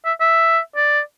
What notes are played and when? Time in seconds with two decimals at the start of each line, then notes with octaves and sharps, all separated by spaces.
0.05 E5
0.20 E5
0.75 D5